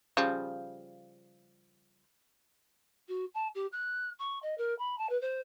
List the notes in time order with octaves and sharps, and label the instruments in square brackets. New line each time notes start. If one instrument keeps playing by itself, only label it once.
[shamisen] C#3 F3 G3
[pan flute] F#4
A5
G4
F#6
C#6
D#5
A#4
B5
A5
B4
C5